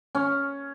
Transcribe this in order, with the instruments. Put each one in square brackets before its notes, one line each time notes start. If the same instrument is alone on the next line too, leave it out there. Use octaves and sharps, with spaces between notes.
[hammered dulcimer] C#4